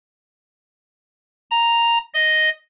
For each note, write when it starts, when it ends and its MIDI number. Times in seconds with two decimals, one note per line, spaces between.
1.51 1.98 82
2.14 2.49 75